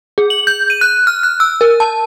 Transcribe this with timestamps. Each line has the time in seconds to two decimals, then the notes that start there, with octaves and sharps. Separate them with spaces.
0.18 G#4
0.30 F#7
0.47 G6
0.70 D#7
0.81 F#6
1.07 F6
1.23 F#6
1.40 E6
1.61 A#4
1.80 A5